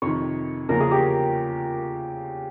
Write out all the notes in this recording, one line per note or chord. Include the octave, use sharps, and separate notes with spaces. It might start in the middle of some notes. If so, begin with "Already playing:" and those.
F2 C3 D#3 C#5
E2 C#3 F3 A#3 C#4 A#4
G#4
G4